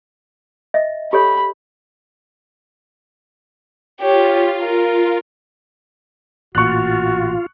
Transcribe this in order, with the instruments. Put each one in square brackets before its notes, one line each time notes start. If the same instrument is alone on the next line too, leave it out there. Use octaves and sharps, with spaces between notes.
[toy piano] D#5 E5
[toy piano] G4 A4 C#5 [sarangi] B5
[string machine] F4 [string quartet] G4 C#5
[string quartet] A#4
[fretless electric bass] A1 A#2 [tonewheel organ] F4 [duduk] F#4 [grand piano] C#6 F#6